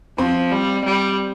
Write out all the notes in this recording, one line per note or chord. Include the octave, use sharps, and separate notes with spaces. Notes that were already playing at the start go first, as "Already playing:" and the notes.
F3 C4
G3
G3